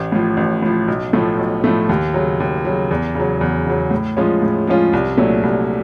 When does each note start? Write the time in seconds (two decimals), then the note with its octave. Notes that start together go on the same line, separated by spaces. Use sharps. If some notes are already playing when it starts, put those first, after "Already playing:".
Already playing: A1
0.12 A2 F3
0.37 A1
0.62 A2 F3
0.88 B1
1.13 A2 F3 A3
1.39 B1
1.64 A2 F3 A3
1.89 D#2
2.14 C#3 F#3
2.40 D#2
2.65 C#3 F#3
2.91 E2
3.15 C#3 F#3
3.41 E2
3.67 C#3 F#3
3.91 A2
4.17 F3 G#3 C#4 F4
4.42 A2
4.67 F3 G#3 C#4 F4
4.93 C2
5.17 A#2 F#3 A3 D4
5.43 C2